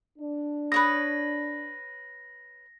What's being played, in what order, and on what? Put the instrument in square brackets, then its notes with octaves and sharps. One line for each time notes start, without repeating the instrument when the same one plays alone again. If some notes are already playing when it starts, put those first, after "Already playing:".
[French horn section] D4
[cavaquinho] B4 C#5 D#6 [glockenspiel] A#6